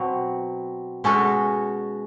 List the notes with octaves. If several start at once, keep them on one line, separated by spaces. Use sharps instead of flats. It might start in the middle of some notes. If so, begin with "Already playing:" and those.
Already playing: B2 F#3 C4
B2 G#3 C#4 F#4 A4